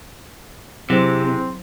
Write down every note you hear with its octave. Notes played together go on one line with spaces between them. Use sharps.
C3 F#3 C4 E4 G#4 C5